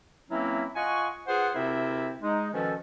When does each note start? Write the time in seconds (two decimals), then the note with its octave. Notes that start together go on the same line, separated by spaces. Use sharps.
0.30 E3 F#3 A#3 C4 C#4 E4
0.76 F4 D#5 F#5 G#5 C#6
1.27 B3 F4 G#4 C5 F#5
1.55 D2 C3 C4 E4 A#4 E5
2.21 G#3 D#4
2.53 B2 D#3 F3 C#4 A4